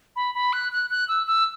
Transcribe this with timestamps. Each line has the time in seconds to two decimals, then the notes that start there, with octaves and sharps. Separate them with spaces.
0.16 B5
0.35 B5
0.53 F#6
0.72 F#6
0.90 F#6
1.08 E6
1.27 E6